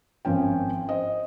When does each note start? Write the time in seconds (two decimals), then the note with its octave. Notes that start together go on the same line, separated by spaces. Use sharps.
0.25 G#1 F3 C#4 G5
0.89 C5 D#5